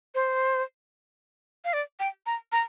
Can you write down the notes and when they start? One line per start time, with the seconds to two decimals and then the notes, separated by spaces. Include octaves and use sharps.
0.15 C5
1.65 F5
1.73 D5
2.00 G5
2.26 A#5
2.52 A#5